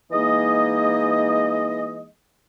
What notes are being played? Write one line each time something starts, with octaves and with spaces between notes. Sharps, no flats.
E3 G#3 A#3 D#4 D#5